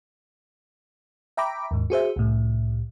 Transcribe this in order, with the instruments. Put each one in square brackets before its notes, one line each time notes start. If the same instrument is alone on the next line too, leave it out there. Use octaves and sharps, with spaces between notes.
[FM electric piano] E5 G5 A#5 B5 D6
D#2 G#2
F#4 G#4 C5 E5
C2 A2